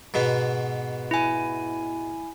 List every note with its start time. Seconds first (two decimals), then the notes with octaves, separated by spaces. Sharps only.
0.14 G#2 B2 B3
1.11 E4 G#5